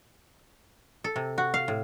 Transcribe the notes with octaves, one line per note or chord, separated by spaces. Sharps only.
A4
C3
F#4
F5
A2